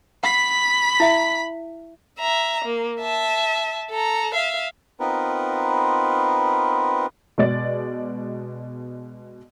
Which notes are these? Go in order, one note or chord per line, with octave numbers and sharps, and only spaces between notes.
F#5 B5 B6
E4 E5
E5 A#5
A#3
E5 A5
A4 A#5
E5 F5
B3 C4 D#4 F4 A#4 B4
B2 G#3 D5 A6